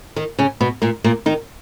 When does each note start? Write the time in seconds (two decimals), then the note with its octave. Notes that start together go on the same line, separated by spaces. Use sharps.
0.16 D#3 D#4
0.39 C#3 C#4
0.61 B2 B3
0.82 A#2 A#3
1.04 A#2 A#3
1.26 D#3 D#4